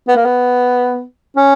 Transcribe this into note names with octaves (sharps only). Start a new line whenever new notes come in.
B3
A#3
B3
C#4